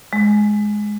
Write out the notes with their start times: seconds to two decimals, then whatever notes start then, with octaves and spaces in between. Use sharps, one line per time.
0.13 G#3